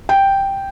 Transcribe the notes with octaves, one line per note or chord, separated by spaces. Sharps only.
G5